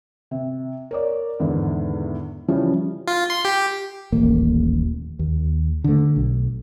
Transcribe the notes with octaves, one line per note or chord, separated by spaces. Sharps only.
C3
A#4 C#5 D5
E2 G#2 D3 D#3
C#3 E3 F3 G3 C#4 F4
F4
C6
G4
D#1 A1 A#3
D#2
D3 A3
B1